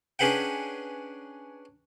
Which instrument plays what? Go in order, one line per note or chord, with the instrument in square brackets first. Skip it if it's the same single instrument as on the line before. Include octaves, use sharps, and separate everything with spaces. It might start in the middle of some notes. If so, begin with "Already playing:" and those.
[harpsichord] C#4 D4 G#4 B4 F#5 G5